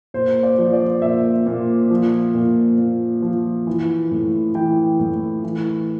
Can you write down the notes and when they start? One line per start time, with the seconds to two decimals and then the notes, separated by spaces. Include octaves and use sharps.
0.14 A#2 C5
0.43 D5
0.58 F3
0.73 D5
1.02 A#2 E5
1.47 A#2
1.90 F3
2.35 A#2
2.78 A#2
3.22 F3
3.67 E3
4.12 A2
4.55 E3 G5
5.00 A2
5.44 E3